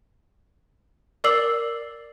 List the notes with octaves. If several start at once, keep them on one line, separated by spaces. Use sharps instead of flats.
A#4 D5 D6 E6 C7 F#7